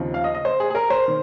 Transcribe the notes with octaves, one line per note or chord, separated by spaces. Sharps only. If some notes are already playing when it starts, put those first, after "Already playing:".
Already playing: D#2 C#3 F3 C4 D#4
F5
D#5
D#5
C5
G#4
G#4
A#4
C5
D#3